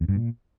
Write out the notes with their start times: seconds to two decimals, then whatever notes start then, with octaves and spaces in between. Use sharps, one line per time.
0.01 E2
0.08 G2
0.16 A#2